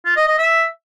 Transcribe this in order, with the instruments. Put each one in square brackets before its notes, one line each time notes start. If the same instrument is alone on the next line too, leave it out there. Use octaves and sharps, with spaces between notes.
[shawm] F4
D#5
D#5
E5